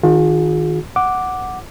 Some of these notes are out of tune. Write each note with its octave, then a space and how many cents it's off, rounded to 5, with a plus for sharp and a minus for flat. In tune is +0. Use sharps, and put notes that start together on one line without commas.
D#3 +0 F4 +45 G#4 +0
F#5 +0 D6 +0